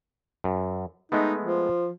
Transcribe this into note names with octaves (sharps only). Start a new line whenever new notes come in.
F#2
G#3 A3 B3 D#4
F3